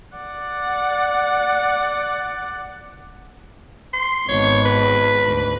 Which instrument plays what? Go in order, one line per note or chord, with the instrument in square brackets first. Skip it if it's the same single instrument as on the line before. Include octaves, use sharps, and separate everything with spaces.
[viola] D5 F#5
[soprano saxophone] C6
[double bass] G#1 B3 [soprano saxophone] C#5
[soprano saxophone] B4
[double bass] D2 G#2